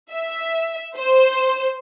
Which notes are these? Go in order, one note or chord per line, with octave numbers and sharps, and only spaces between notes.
E5
C5